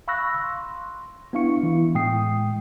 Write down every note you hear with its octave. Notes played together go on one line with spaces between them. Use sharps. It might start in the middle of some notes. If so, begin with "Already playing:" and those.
F5 B5 C#6 E6 F#6 A#6
C6
B3 D4 E4 F5 C#6 C#7
E3 B3 E4
A2 G#3 G5 D#6 C7